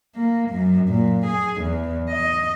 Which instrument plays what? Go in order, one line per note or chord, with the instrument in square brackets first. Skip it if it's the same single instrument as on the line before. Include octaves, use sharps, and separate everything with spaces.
[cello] A#3
F#2
A#2
G#4
E2
D#5